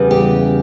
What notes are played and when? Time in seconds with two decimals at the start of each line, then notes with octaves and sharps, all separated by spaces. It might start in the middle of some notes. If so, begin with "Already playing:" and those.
Already playing: E2 C#3 G3 B3
0.11 G4